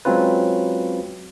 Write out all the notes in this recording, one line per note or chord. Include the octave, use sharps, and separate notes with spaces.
F#3 G#3 C4 C#4 F4 B4